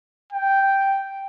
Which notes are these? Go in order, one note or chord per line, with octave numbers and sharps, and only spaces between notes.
G5